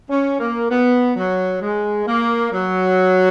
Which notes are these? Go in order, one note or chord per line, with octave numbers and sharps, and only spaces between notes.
C#4
A#3
B3
F#3
G#3
A#3
F#3